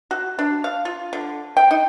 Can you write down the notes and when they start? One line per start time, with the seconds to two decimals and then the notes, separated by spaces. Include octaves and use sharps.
0.11 F#4
0.39 D4
0.64 F5
0.85 F4
1.13 D3
1.57 G5
1.71 D#4